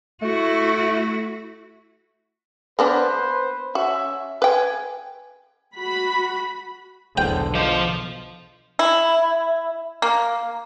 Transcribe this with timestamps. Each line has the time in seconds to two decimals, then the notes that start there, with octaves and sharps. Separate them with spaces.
0.22 A3 E4 F#4
2.79 A#3 B3 D4 B4 C5
3.75 C#4 F#4 E5
4.42 B4 G5 G#5
5.77 F#4 B5
7.18 B1 E2 B2 D3 G#4 C5 G5
7.55 F3 C5 D#5 D6 G6
8.79 E4
10.02 A#3